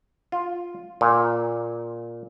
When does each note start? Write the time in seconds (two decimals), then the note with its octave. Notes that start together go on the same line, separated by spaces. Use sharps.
0.32 F4
1.01 A#2